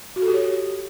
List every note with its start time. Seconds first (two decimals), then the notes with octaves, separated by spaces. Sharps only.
0.16 F#4
0.22 A4
0.28 G4
0.34 C#5